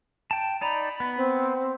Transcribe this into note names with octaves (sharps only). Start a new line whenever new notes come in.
G5 A5
D#4 D5 A#5 B5
B3
C4